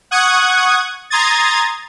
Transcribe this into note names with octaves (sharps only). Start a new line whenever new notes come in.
F#5 C#6 D#6 F#6 G#6
A#5 C6 D#6 G#6 A6